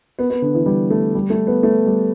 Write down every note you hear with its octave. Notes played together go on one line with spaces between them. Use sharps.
B3
B3
D3
E3
G3
A3
G3
A3
B3
A3
G3